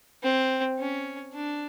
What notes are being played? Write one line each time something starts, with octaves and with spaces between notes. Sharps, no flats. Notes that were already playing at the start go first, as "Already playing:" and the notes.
C4
C#4
D4